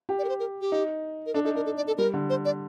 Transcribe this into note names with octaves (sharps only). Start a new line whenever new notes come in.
G4
D5
A#4
C5
A#4
G4
D#4
A#4
D4 A4
D#4 A4
D4 A#4
A4
D5
A4
G3 A#4
D3
C5
D5